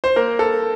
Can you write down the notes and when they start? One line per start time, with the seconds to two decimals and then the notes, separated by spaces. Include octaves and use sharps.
0.04 C5
0.16 A#3 A#4
0.39 A4